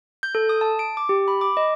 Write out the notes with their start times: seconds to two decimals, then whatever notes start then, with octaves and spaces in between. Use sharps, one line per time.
0.23 G6
0.35 A4
0.49 D#6
0.61 A5
0.79 D7
0.97 D6
1.09 G4
1.28 B5
1.41 D6
1.57 D#5